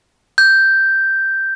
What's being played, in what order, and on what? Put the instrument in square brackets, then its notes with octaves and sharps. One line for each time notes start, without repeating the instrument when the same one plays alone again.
[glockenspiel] G6